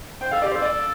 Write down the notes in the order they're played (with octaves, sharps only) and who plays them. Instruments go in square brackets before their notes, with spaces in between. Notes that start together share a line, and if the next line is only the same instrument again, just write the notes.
[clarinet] C5 [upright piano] G5
[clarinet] A4 [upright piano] F5
[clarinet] G4 [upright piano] D5
[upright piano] C5
[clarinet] A4
[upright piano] D5